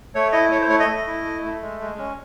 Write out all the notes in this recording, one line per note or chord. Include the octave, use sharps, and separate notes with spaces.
A3 C#5
E4 D#5
A3 C#5
C5
A3 C#5
D#5
A3
E4
A3
A3
G#3
G#3
C#4